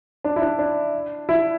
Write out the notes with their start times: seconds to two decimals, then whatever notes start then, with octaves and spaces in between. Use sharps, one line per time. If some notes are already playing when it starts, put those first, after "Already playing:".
0.24 D4
0.36 E4
0.42 D4
0.59 D4
1.29 E4